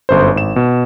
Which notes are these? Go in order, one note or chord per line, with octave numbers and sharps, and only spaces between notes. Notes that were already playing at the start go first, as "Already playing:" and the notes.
G1 F#2 C5
G#1 E7
B2